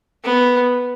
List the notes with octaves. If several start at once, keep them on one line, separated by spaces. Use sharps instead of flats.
B3